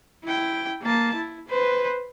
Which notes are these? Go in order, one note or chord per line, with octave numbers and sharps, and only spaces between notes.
E4 G5
A#3 A5
E4
B4 C5